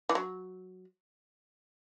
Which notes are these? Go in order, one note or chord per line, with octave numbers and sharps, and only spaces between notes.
E3
F#3